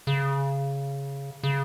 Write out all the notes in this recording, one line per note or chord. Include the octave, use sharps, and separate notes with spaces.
C#3
C#3